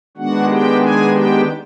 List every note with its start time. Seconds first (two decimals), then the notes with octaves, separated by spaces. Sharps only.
0.17 D#3 G#3 B3 D4 F#4 F#5
0.49 G4 G5
0.81 G#4 G#5
1.13 G4 G5